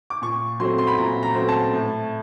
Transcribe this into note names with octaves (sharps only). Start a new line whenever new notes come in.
D6
A#2 C#6
F#3 A3 C4 C6
C6
B5
A#2 A#5
A#5
F#3 A3 C4
A5
A2